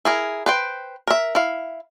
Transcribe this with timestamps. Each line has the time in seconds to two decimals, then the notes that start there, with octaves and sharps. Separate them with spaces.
0.05 E4 G#4 A#4
0.46 B4 C5 G5
1.07 A#4 E5
1.35 E4 F5